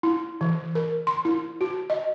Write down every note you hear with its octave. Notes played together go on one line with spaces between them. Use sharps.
E4
E3
A#4
C6
E4
F#4
D#5